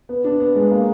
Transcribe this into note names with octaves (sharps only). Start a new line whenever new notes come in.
B3
D4
B3
G#3
A#3